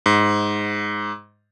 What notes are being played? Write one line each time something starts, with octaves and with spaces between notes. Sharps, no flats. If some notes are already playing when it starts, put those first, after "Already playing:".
G#2